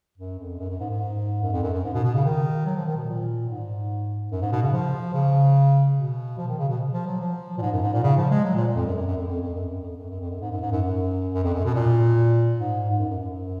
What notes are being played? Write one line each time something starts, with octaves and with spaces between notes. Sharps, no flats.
F#2
F2
F#2
F#2
G#2
G#2
F#2
F2
F#2
F#2
G#2
B2
B2
C#3
D#3
F#3
F3
D#3
B2
A#2
G#2
F#2
G#2
B2
C#3
F3
C#3
B2
F3
D#3
C#3
B2
F3
F#3
F3
A#2
G#2
F#2
G#2
A#2
C#3
F3
G#3
F#3
A#2
F2
F#2
F#2
F#2
F2
F2
F2
F#2
F#2
F2
F#2
F#2
F2
F#2
G#2
F#2
G#2
F#2
F#2
F#2
F2
F#2
B2
A#2
G#2
G#2
F#2
F#2
F#2
F#2